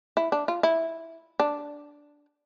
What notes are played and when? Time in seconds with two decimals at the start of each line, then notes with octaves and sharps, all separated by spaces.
0.17 E4
0.32 D4
0.48 F4
0.63 E4
1.40 D4